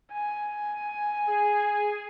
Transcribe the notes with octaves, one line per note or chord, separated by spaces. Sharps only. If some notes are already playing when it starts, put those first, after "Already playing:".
G#5
G#4